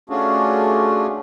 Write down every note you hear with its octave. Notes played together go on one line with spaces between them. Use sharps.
A3 C#4 D4 F4 F#4 G#4